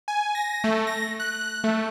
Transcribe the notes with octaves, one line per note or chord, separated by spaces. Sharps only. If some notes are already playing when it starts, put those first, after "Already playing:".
G#5
A#6
A3
A#6
F#6
A3